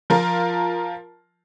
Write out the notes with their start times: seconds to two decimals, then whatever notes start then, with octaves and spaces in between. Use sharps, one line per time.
0.10 F3 F4 A#4